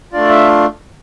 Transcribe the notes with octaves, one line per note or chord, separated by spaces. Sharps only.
A3 D4 F4 D5
E5